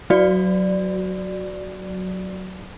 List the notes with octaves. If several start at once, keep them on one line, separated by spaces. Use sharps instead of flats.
F#3 F#4 D5